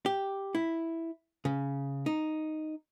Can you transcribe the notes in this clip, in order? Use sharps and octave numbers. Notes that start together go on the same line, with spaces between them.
G4
E4
C#3
D#4